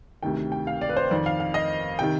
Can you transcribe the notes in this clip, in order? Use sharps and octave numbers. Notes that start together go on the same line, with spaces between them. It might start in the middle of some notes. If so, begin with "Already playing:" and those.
D2 C3 D#3 G5
G5
F5
D5
B4
C5
F2 D#3 D5
F5
F5
D#5
C3 D#3 G5